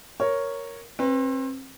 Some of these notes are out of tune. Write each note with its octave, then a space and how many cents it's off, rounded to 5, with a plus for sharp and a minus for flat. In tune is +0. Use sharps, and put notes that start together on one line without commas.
A#4 +0 C#5 +0
C4 +35 B4 +0